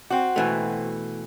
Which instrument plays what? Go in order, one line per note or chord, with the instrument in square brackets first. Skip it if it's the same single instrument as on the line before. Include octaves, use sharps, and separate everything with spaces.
[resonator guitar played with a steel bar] C4 F#4
[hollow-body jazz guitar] B2 E3 A3